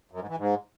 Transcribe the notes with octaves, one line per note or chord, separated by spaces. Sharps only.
F#2
G#2
E3
G#2